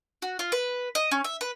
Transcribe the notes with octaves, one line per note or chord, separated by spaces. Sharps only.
F#4
F4
B4
D#5
C#4
E5
B4